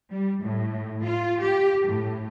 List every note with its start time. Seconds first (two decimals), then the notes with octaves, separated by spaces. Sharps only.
0.11 G3
0.43 A2
1.03 F4
1.41 G4
1.87 A2